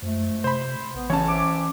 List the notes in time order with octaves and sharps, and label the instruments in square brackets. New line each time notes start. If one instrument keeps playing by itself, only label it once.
[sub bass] F#2 [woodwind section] F3 G#3 A3
[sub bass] C3 [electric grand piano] C5 B5
[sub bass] A1 [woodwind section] B3
[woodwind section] C#3 [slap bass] E3 C#4 [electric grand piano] C#5 A5
[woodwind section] C4 E5 D6